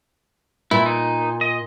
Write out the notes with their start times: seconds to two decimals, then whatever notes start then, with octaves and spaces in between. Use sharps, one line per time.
0.71 A#2 E4
0.86 D#4
1.41 D#5